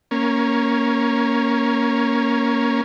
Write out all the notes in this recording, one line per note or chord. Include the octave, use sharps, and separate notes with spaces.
A#3 C#4